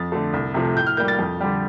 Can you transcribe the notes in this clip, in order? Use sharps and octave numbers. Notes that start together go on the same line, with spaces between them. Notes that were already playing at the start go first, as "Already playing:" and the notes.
Already playing: F2 A6
D3 A3
C2
C3 F3 A3
A2 G6
F6
G3 A#3 G6
A6
F2
D3 G3